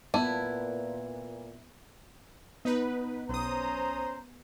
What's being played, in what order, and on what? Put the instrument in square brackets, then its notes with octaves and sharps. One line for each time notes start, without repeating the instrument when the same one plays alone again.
[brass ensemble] A#2 [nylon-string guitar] B3 [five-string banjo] E4 [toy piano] A5
[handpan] B3 [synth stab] D#4 B4
[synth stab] B1 D#6 [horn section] C#4 C5 A#5